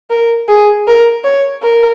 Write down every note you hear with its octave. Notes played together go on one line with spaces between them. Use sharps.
A#4
G#4
A#4
C#5
A#4